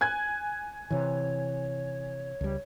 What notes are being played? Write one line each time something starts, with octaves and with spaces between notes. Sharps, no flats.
G#5 F#6 G#6
C3 E3 C#5
C#2 G3